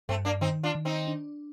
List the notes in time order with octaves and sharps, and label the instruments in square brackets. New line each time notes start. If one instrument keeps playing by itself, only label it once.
[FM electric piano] G2 [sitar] A3 C4
[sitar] A#3 D4
[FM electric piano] D#3 [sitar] C4 D#4
[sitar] D4 F4
[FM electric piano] D#3
[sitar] C4 D#4
[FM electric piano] D4